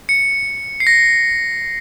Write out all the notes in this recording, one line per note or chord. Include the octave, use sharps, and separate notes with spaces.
C#7
C7
A#6